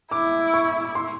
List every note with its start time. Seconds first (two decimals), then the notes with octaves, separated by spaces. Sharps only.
0.11 E4 D6
0.54 C#6
0.95 C6